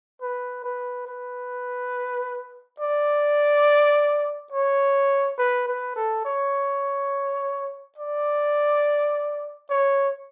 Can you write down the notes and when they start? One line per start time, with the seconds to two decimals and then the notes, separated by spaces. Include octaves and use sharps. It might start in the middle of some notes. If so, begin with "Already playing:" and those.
0.22 B4
0.64 B4
1.07 B4
2.80 D5
4.52 C#5
5.38 B4
5.67 B4
5.96 A4
6.25 C#5
7.98 D5
9.70 C#5